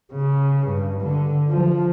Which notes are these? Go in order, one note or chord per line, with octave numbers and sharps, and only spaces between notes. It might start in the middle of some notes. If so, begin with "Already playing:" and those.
C#3
G2
D3
F3